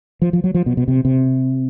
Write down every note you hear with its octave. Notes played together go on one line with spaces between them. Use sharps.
F3
F3
F#3
F3
B2
B2
C3
C3